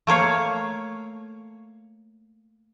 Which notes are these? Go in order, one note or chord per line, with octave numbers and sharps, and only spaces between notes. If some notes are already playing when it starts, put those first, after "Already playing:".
A3 A#3 C#5 F5